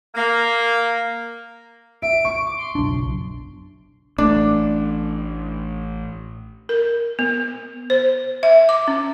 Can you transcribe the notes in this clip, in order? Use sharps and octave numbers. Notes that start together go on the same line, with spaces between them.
A#3
E5 D7
C#6
D6
C6
F#1 B1 D4
A1 A3 D4
A#4
B3
C5
E5
D6
C#4